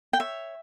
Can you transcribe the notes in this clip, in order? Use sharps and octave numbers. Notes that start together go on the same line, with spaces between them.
G5
C#5 E5